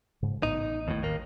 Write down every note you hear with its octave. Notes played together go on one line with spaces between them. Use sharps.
G#2 C#3
A1 B3 D#4
D#2 A2
D#2 A#3